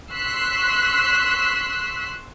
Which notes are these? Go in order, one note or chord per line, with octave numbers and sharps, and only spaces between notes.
C6 C#6 E6 F#6 B6 C7